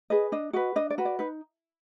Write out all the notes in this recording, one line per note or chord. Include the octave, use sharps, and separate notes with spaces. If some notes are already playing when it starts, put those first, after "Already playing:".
G#4 B4 D#5
D4 D#5
F#4 B4 D#5
D4 D#5
D5
F#4 B4
D5
D#4 B4